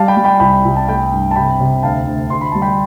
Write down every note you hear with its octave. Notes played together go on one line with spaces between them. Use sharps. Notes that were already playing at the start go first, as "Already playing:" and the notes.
Already playing: G3 F5 A5
G5 B5
G3
G5 B5
C2 G5 B5
C2
A5
A3 G5 B5
G2
A5
C3 G5 B5
C3
D2 F5 A5
D2
D2 C6
B5
G3 A5
G5 B5